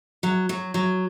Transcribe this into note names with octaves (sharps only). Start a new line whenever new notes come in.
F#3
F#3
F#3